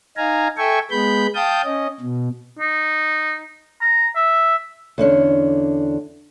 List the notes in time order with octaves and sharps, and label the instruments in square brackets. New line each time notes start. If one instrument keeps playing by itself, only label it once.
[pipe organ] D#4 F5 G#5 A#5
A4 E5 G5 G#5 C#6
G#3 B3 B5 G6
F5 G5 A5 D#6 G6
C#4 D#5
B2
[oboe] D#4
A#5
E5
[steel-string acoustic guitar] E2 D3 C#4 D4